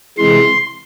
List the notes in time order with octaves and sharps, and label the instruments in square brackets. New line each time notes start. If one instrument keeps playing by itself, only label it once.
[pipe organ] C3 E3 G#3 C6